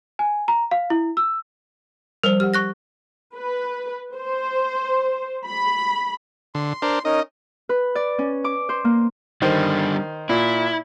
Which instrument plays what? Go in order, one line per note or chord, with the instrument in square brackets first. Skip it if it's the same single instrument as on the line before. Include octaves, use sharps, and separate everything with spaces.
[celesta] G#5
A#5
F5
E4
E6
[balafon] F3 G3 [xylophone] A#4 C5
[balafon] G4 F#5 [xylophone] F6
[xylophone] C#6 F#6 A#6
[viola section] B4
C5
B5
[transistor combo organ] D3 [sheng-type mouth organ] C6
[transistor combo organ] D4 A#4 C5
[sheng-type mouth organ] C#4 D#4 A#4 [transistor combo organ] D#5
[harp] B4
D5
C#4
D6
C5
A#3
[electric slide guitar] D3 G3 [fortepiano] D#3 C5
[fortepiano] A#2 [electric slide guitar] E4